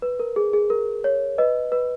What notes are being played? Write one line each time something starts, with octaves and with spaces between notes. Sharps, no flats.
B4
A#4
G#4
G#4
A#4
C#5
B4 D#5
B4